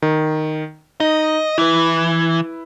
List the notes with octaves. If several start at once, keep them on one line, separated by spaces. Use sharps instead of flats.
D#3
D#4 D#5
E3 E4 B4